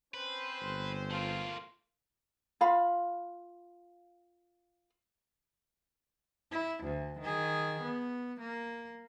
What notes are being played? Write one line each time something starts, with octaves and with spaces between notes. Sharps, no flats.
C4 C#4 B4 C5
G1
A3 A#3 F4
F4 F5 B5
E4
D2
D#3 G#4
B3
A#3